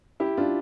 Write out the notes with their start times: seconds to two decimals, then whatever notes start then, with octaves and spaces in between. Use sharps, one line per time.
0.20 E4 G4
0.37 D4 F4